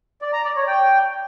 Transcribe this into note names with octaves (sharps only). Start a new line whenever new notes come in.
D5
A#5
D5
C#5
G5